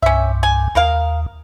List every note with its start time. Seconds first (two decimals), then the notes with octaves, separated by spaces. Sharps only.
0.02 C2 G2 C#4 E5
0.43 G#5
0.75 D#2 A#3 A#4 F5